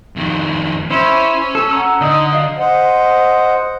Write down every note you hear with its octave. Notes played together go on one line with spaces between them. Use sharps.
F2 D#3
C#4 E4 C5
A4
F#5 A#5 E6
D3 D#4 D#5 D#6
F#3 D#5 F5
C5 D#5 F#5